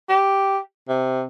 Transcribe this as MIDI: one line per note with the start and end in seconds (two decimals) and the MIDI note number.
0.09 0.58 67
0.88 1.24 48